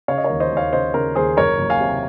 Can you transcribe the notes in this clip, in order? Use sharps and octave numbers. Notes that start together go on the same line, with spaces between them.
C#3 C#5 F5
D#5
A#4 C#5
D#2
C5 D#5
D#2 C#5 F5
C#3 C5 D#5
C#3 A#4
D#2 G#4 C5
F#1 A#4 C#5
F#1
F5 G#5
C3